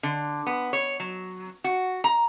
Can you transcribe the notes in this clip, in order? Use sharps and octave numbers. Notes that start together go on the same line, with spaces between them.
D3
B3
C#5
F#3
F#4
A#5